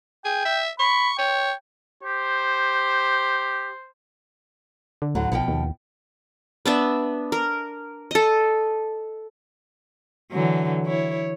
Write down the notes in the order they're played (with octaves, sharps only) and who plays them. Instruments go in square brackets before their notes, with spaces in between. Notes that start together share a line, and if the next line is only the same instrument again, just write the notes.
[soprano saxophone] G#4 [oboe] G5
[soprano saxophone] E5
[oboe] B5 [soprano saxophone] C#6
[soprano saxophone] C#5 [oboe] G5
[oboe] G4 [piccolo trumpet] C5
[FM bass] D3
[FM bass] D2 [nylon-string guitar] A2 D3 F#3
[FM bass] B1 [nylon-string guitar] B2 F3 G5
[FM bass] D#2
[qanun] B3 D4 E5
A#4
A4 D#5
[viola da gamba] D3 E3 F#3
E4 C#5